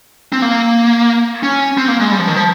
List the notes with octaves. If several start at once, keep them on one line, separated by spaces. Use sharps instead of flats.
C4
A#3
C#4
C4
A#3
G#3
G3
F3
D#3
F3